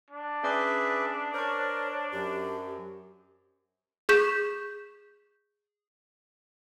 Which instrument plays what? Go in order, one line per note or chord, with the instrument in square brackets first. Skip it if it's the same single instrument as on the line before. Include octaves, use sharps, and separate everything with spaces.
[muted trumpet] D4
[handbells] C#4 D5 D6 [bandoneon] G#4 B4 E5
[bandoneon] A#4 [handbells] C5 C#6 [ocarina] C#5
[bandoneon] F#2 [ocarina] G4
[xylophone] G#4 C#6 G6 B6 E7